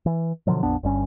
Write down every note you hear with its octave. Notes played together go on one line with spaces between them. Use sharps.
E3
B2 D3 F3 F#3
A#1 F2 B3 D4
G1 G2 C#4